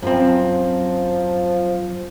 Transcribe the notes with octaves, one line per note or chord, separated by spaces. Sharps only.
F#2 F3 C4